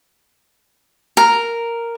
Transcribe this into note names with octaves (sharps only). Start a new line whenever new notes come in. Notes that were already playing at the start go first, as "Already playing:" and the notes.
A#4